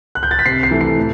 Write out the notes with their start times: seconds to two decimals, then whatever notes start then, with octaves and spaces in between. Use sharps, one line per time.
0.15 F#6
0.23 G6
0.31 A6
0.39 B6
0.45 C3 C7
0.63 C7
0.71 E3 A3
0.81 C7
0.98 A2